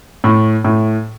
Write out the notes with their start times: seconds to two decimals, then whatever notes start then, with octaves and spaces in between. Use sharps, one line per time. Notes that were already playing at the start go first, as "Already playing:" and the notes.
0.24 A2
0.64 A2